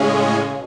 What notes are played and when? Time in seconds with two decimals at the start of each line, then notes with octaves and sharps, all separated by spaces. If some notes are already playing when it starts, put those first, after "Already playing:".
Already playing: A2 C#3 G#3 C#4 G#4
0.51 B2